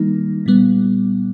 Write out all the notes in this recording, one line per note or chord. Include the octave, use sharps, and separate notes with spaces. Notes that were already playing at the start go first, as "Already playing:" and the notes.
Already playing: D#3 G3 A#3 D#4
A#2 G3 B3